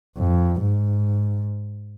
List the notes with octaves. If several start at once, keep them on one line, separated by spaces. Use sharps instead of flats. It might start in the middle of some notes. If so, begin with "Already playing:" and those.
F2
G#2